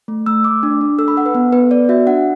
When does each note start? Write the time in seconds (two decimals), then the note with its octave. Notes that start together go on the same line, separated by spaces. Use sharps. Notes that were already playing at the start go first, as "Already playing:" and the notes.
0.08 A3
0.26 A3 E6
0.44 A3 D6
0.63 D4
0.81 D4
0.99 A4 E6
1.08 B5
1.17 A4 F#5
1.26 B4
1.35 B3
1.53 B3 B4
1.71 B3 D5
1.89 F#4 E5
2.07 D4 F#5